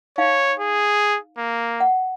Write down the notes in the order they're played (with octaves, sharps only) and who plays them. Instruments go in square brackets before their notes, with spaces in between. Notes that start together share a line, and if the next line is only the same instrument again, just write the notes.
[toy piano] D#4 F5 [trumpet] C#5
[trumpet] G#4
A#3
[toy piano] F#5